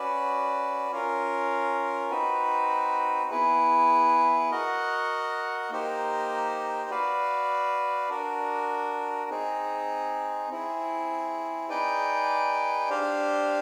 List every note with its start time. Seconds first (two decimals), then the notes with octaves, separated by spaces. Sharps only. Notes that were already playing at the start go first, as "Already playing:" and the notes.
Already playing: C#4 F#4 B4 D5
0.91 C#4 F4 A#4
2.11 C4 D#4 F#4 B4
3.31 B3 E4 G#4 B4
4.51 F#4 A#4 D#5 F#5
5.70 A#3 D#4 G4 C5
6.90 F#4 B4 D5 F5
8.09 D4 F#4 A#4
9.30 C4 D#4 G#4
10.50 C4 E4 G#4
11.69 D#4 G#4 B4 D5 G5
12.89 D4 G4 C5 F5